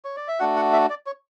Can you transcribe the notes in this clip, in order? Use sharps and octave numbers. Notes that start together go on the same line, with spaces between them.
C#5
D5
E5
A3 D4 F#4 F#5
F#5
E5
D5
C#5